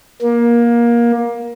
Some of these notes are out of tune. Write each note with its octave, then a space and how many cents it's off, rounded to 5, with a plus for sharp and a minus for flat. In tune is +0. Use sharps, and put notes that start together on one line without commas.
A#3 +20